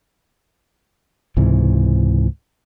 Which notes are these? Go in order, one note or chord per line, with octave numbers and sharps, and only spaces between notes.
C#2 G#2 C3 E3